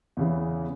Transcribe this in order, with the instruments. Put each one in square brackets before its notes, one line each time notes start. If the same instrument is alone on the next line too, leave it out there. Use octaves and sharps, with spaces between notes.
[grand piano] E2 C#3 E3